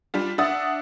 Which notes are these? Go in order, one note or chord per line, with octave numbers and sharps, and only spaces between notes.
G3 D4 F4
D4 E5 F#5 D#6 A6